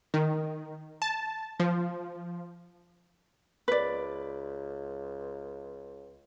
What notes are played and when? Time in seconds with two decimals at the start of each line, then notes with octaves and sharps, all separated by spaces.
0.14 D#3
1.02 A5
1.60 F3
3.68 C#2 B4 D5